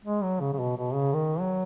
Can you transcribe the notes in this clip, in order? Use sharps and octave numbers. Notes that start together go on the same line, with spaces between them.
G#3
F#3
C#3
C#3
B2
B2
C#3
D#3
F#3